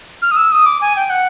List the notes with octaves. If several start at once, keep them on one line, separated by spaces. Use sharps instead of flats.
F6
D#6
E6
D#6
D6
G#5
G5
F#5